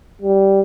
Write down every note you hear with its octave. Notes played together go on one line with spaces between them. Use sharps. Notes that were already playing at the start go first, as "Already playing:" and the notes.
G3